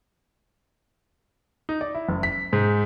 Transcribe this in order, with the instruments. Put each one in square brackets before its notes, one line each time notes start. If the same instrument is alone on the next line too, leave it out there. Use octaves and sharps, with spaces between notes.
[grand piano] D#4
D5
E4
F#1
B6
G#2